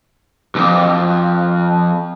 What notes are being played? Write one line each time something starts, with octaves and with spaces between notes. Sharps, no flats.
B1 F2